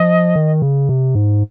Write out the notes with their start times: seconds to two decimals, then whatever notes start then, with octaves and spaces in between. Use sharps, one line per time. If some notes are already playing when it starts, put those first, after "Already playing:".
Already playing: F3 D#5
0.35 D#3
0.62 C#3
0.89 C3
1.15 G#2